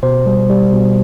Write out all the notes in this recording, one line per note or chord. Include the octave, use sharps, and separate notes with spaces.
B2 C5
G3
G3
B2